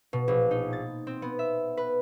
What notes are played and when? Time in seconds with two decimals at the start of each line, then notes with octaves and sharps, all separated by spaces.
0.13 B2
0.28 A#1
0.51 D#4
0.73 A6
1.07 C4
1.22 B3
1.39 E5
1.77 B4